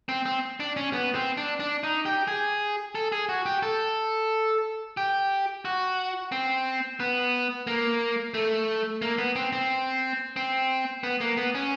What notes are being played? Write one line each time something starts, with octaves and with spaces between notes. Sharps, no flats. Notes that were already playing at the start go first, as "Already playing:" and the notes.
C4
C4
D4
C#4
B3
C4
D4
D4
D#4
G4
G#4
A4
G#4
F#4
G4
A4
G4
F#4
C4
B3
A#3
A3
A#3
B3
C4
C4
C4
B3
A#3
B3
C#4